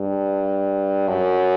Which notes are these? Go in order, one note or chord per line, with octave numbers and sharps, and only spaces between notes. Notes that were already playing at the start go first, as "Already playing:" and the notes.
Already playing: G2
F#2